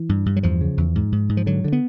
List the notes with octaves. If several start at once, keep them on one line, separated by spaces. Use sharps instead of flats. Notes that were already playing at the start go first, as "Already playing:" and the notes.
Already playing: E3
G2
G2
F#3
E2 F3
C#3
E2
G#2
G#2
G#2
F3
D3 F#3
D3
B3